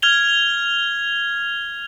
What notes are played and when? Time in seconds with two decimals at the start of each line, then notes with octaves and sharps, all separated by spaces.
0.02 F6 G#6 F7 G7